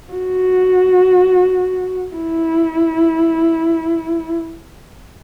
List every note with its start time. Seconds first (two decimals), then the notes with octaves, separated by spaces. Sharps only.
0.13 F#4
2.15 E4